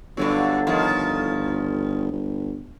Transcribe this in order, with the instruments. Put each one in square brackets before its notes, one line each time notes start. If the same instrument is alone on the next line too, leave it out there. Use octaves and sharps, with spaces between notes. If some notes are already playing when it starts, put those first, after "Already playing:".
[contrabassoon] G1 [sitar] G2 D3 F#3
[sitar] A2 D#3 F3
[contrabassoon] G1